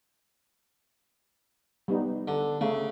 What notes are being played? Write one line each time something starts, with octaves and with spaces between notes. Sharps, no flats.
G3 B3 D#4
D3
C#3 A3